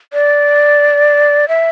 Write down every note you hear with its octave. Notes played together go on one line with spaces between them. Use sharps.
D5
E5